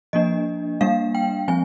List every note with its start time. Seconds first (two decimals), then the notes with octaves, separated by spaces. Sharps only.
0.13 F3 A#3 D4 D#5
0.81 G3 A#3 D4 F5
1.15 G5
1.48 F3 G#3 C4 G#5